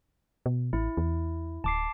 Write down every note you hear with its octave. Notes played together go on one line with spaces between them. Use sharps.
B2
A1 E4
E2
D1 A5 D6 C7